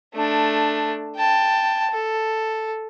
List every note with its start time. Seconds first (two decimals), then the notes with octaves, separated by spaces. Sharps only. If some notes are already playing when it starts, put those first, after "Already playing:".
0.14 A3 D4
1.16 G5 A5
1.91 A4